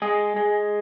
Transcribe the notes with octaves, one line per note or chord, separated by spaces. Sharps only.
G#3 G#4
G#3